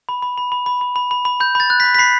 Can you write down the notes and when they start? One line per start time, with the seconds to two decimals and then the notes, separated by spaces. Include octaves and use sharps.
0.09 B5
0.22 B5
0.38 B5
0.52 B5
0.66 B5
0.81 B5
0.96 B5
1.11 B5
1.25 B5
1.40 B5 G6
1.55 B5 A6
1.70 F#6
1.80 B5 B6
1.95 B6
1.99 B5 C7